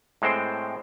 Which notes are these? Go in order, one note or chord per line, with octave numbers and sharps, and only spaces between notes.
A2 G#3 C4 C5 G5